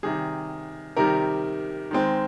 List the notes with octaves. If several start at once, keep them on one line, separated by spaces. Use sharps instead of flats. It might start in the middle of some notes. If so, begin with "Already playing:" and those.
C3 D#3 G3 G#4
C3 D#3 G3 A#4
D#3 G#3 C4